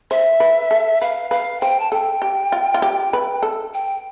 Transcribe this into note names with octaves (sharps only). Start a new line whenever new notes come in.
C5 E5
B4
A4
B4 F5
B4 F5
C5 G5
A5
A4 G5
G4
F4
F4
G4
B4
A4
G5